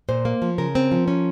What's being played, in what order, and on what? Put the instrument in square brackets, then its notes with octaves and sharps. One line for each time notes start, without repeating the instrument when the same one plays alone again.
[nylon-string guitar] A#2 C5
A#3
F3
C#3 A#4
C4
F3
C#4